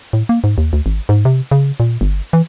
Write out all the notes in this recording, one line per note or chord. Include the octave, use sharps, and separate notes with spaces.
A2
A#3
G#2
D#2
D2
G#1
G#2
C3
C#3
A#2
G1
E3